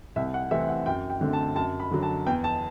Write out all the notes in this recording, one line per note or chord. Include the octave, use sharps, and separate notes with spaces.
C2 E5
F#5
C3 E3 A3 C4 E5
F#5
F#2 G5
G5
D3 A3 C4
A5
F#2 A5
B5
D3 F#3
A5
E2 G5
A5